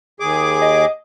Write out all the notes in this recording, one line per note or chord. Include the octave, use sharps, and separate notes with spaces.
D#2 G#4 D6
D#5